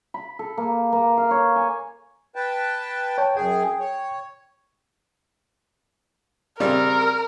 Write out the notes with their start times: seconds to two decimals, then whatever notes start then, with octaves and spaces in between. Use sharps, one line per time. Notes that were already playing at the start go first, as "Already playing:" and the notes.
0.14 B5
0.39 A4
0.58 A#3
0.92 A#3
1.18 F5
1.31 C#5
1.56 G#5
2.36 B4 G5 A5
3.18 C#5 G5 A5
3.37 F#2 G#4 G5
3.80 C#5
6.60 C#3 G3 C4 A#4